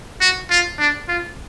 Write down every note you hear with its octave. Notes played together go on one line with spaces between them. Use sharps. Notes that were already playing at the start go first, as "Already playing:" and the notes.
F#4
F4
D4
F4